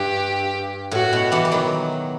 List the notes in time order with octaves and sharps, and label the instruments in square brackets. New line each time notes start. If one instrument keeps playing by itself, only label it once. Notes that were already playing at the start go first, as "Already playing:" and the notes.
Already playing: [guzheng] G2 [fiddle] G4
[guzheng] A2 [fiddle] F#4
[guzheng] B2
E3 G3
G3
D#3 F#3